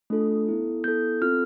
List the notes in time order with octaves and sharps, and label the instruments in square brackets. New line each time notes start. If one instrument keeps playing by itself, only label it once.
[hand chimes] A3 D4 F4 A4
B3 E4 A4
B3 E4 A4 G6
C4 F4 A4 F6